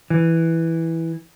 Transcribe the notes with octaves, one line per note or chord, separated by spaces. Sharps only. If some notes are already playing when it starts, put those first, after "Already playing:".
E3